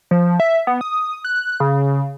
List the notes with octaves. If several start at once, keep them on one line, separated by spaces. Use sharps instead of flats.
F3
E5
B3
D#6
F#6
C#3